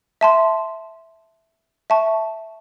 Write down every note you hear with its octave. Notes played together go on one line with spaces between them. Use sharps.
E5 A5 C6
E5 A5 C#6